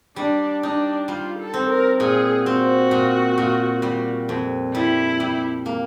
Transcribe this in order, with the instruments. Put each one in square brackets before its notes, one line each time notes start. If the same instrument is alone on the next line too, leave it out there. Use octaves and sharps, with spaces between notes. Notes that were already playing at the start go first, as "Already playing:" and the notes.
[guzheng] G3 [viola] D4
[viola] D4 [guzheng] D#4
[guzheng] G3 [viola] F4
[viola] A4
[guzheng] C4
[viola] A#4
[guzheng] A#2 [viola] G#4
[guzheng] C4 [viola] F#4
[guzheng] A#2
A#2
G3
F2
[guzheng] G3 [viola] E4
[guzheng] G3
A#3